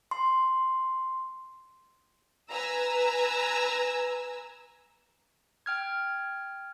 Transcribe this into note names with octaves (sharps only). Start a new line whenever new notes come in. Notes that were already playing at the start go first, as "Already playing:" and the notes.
C6
B4 G#5 A#5 E6
G5 F6 G#6